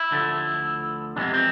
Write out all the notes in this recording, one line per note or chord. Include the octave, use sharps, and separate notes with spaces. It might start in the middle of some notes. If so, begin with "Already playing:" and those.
Already playing: E4
D2 D3 F3 A3
F2 C3 E3 G#3 B3 D4
C4